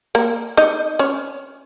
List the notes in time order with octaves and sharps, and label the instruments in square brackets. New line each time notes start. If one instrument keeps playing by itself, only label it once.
[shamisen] A#3 A#4
D#4 D#5
C#4 C#5